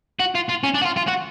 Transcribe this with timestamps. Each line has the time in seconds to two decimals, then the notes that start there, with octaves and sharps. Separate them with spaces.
0.19 F#4
0.35 F4
0.49 F4
0.64 C#4
0.74 D4
0.82 F#4
0.85 F4
0.97 F4
1.07 F#4